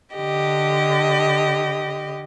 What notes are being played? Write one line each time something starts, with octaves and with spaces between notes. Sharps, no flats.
D3 G4 D#5